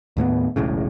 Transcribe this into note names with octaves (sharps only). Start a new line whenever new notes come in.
D#2 A2 A#3 B3
E1 B1 A2 C#3